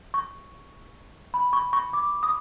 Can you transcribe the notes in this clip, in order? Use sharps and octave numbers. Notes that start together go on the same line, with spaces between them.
C#6
B5
C#6
C#6
D6
D#6